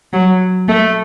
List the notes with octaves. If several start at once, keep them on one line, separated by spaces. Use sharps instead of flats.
F#3
A3